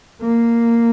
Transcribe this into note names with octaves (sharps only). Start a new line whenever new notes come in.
A#3